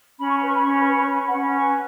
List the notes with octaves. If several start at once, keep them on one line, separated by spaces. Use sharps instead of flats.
C#4 B5
C#6
B5
B4 C#6
B5
C#4 C#6
B5
C#6
B4 B5
C#6
C#4 B5
C#6
F#5 B5
C#4
B4 G#5 C#6